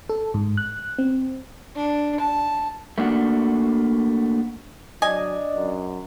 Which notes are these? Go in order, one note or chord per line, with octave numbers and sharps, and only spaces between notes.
A4
G#2
F#6
C4
D4
A5
A3 A#3 D4 F#4
F#3 D4 D#5 G#5
F#2